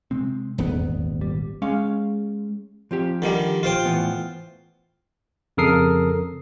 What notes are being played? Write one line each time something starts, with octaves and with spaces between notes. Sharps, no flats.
C3 G#3 C4
D#1 G#1 E2 B3
G3
G#3 C#4 F5
F3 C4 G4
D3 D#3 G3
F4 C5 G5
A2 E3 B3
F2 C#3 A4 A#4 D#6 C7